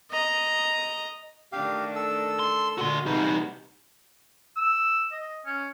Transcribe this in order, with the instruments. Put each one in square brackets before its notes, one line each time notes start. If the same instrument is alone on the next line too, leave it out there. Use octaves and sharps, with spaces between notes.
[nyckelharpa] D#5 A#5
[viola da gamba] D#3 A3 D4 [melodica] G4 F5
[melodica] A4 E6
[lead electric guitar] C6
[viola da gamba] A#2 D3 G#3 [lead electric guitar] F#4 C6
[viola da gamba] C3 E3 F#4 [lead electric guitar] G3 D#4 [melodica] B4
[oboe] E6
D#5
C#4